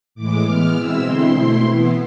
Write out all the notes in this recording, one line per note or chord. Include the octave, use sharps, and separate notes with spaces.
A2 E3 G#3 D6
E3 G#3 B3 F6
B2 G#3 C4 E4 E6
D3 G#3 C4 E4 C6
B2 A3 C4 E4 C6
E3 B3 E4